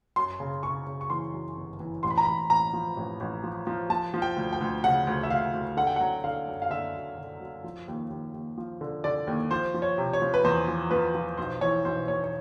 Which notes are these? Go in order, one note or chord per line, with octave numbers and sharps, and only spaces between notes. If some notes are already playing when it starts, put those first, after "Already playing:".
F#2 C6
C#3
C#3 C#6
C#3
C#6
E3 C6
F#2
G1
E3
A1 C6
B5
A#5
A1 B5
A1 A#5
F3
A1
A1
F3
F3
F3 A5
F3
G5
D2
G5
D2
C#3 F#5
D2
E5
D2 F5
D2
D3 F#5
G5
F#3 F#5
D3 F5
F#2
F5
D3 E5
F#2
D3
F#2
F3
D#2
D#2
D#2
F3
D3
D3 D5
D#2
F3 C5
F3
C#5
C3
C#5
F3
B4
E2 C5
F3
F3 B4
F3
B1 C5
E3 C#5
B1 C5
B1 C#5
C#5